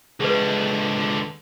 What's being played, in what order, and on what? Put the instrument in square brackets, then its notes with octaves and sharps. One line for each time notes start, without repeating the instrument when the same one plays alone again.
[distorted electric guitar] C#2 D3 [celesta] G#4 B4